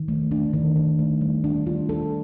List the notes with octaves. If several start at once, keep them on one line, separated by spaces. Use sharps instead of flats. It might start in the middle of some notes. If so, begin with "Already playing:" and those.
Already playing: D#3
A3
D4
D#3
D#3
A3
G3
D4
F4
A4